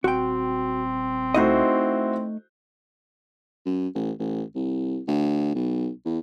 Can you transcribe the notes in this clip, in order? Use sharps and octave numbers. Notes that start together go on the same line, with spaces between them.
D#1 C4 F#4 G5
A3 D#4 E4 F#4 C5 D#5
F#2
A1
A1
C2
D2
B1
E2